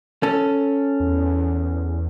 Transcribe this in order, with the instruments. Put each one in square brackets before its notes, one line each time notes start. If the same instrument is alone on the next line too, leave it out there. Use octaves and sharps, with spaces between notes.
[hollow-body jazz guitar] C#4 A4
[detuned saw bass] E2